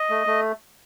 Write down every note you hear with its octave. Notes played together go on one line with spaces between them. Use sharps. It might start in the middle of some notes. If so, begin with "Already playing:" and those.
Already playing: D#5
A3
A3